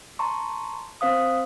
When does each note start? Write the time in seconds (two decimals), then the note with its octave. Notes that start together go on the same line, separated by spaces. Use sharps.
0.19 A5 A#5 C6 C#6
1.01 C4 C5 F5 D#6